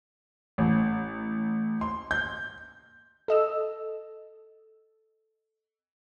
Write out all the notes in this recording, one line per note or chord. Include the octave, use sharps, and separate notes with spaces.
A1
C6
G6
A4 D#5 E6